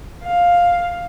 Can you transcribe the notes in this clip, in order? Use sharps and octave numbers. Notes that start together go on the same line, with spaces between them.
F5